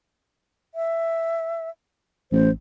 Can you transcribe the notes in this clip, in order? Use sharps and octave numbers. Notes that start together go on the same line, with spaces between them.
E5
A1 C5